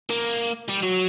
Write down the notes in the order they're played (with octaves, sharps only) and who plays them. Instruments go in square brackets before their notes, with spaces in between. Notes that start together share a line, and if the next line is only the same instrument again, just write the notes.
[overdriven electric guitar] A#3
G3
F#3